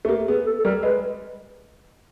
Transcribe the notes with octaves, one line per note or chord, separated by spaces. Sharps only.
A3
A#3 G4
B3 G#4
A4
A4
G3 A#4
G#3 B4